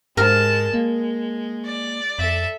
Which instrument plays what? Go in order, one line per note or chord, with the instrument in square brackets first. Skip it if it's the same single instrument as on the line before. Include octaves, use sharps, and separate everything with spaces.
[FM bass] G#2 [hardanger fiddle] G#3 A5 [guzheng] A#4
[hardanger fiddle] G#3 [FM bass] A#3
[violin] D5
[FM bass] F2 [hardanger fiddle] A4 E5